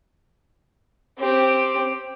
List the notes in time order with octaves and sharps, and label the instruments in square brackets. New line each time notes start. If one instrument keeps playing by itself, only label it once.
[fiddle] C4 G4